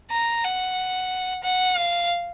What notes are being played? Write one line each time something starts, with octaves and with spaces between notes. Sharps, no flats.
A#5
F#5
F#5
F5